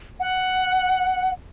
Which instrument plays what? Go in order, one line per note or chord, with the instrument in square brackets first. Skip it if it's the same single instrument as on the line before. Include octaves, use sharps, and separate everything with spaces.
[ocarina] F#5